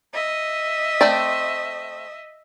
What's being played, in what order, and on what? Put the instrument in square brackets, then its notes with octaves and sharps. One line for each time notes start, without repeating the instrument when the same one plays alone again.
[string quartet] D#5 E5
[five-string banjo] A3 C4 D5